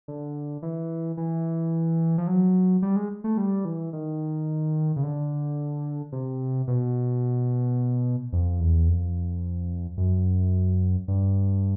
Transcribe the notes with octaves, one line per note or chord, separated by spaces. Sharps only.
D3
E3
E3
F3
F#3
G3
G#3
A3
G3
E3
D#3
C#3
D3
C3
B2
F2
E2
F2
F#2
G2